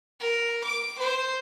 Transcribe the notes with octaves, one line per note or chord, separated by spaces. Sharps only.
A#4
D6
C5